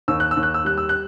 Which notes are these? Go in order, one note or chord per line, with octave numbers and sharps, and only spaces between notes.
D#2 E6
F#6
E6
D#2
F#6
E6
G3 F#6
E6
F#6